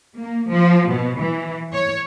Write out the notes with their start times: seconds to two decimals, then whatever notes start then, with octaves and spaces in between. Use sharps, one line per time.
0.19 A#3
0.50 F3
0.91 B2
1.21 E3
1.73 C#5